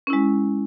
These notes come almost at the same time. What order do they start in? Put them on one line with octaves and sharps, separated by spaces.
C#4 E4 G#3